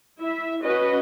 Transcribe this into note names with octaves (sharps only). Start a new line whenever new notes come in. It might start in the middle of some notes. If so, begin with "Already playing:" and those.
E4 E5
C#4 F#4 B4 D#5